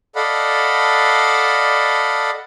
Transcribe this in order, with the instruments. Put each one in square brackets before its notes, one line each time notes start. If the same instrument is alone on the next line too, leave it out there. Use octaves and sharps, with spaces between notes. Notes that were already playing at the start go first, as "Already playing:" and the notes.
[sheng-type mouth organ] A4 D5 D#5 F5 F#5 B5